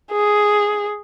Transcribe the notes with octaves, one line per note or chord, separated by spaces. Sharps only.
G#4